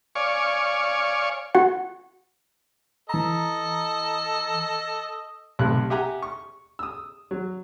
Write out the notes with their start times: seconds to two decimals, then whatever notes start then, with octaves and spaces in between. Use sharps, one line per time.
0.15 C#5 D5 F5 G#5 C#6
1.55 F#4 F#5
3.09 E3 A4 D#5 A#5
5.59 B1 C3 A3 F#6
5.90 G4 E5 F#5 G#5 A#5
6.22 C#6
6.79 D#6 E6
7.31 F#3